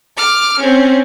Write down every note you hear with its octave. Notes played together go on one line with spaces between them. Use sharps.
D6 F6
C4 C#4